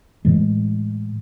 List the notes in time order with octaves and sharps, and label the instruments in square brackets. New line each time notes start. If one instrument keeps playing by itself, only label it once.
[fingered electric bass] A2 E3 G#3